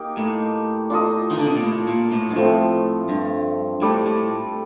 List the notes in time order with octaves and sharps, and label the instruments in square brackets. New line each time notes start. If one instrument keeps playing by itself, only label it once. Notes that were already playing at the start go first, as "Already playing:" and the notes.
Already playing: [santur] A#3 D#4 G4
[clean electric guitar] A2
[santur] D4 F4 A4 D#5
[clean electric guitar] D#3
D3
C3
A#2
A2
A#2
A2
G2
[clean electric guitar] A2 [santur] F3 A3 C4
[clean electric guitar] G2
[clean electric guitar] A2 [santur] G3 D4 A4
[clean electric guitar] A2